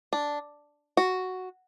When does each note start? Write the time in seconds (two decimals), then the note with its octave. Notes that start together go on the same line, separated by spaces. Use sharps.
0.13 D4
0.97 F#4